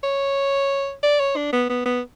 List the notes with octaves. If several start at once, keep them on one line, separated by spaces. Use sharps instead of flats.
C#5
D5
C#5
D4
B3
B3
B3